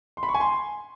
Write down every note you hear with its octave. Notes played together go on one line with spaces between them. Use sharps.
C6
B5
C#6
G#5
C6